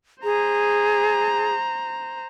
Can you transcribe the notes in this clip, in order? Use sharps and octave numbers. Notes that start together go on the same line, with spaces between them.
G#4 C5 A#5